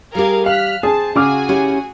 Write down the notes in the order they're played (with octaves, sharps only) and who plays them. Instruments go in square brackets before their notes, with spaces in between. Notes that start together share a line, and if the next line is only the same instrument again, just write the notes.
[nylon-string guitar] G3 G4 [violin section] G#4 A#4 F5
[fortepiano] F5 [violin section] F6 F#6 B6
[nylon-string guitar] C4 [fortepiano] G#4 [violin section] A5
[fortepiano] C#3 D6 F6 [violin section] F#4 G#4 G#5 [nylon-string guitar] F5
[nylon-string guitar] C#4 E4 G4